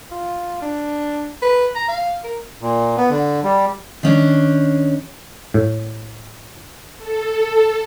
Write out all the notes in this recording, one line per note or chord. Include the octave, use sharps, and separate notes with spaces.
F4
D4
B4
A#5
F5
A#4
A#2
B3
D3
G3
D#3 C#4 D4
A2
A4